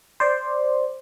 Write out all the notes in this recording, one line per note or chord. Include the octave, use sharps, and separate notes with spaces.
C5 D5